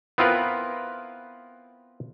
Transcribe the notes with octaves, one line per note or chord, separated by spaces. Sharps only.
B3 C4 E4 F4 A#4 B4